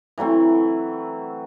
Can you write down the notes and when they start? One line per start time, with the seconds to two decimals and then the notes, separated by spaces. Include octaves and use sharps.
0.18 E3 F#3 A3 C4